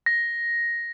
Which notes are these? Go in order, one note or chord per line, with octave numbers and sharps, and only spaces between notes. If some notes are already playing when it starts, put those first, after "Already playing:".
A#6